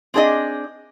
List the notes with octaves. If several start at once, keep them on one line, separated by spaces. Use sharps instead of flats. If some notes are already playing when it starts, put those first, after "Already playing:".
C4 D4 G#4 D5 D#5